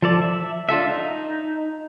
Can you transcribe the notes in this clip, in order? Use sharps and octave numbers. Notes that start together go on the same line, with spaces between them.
F3 A4 D5
E5
D4 F4 A4 E5
D#4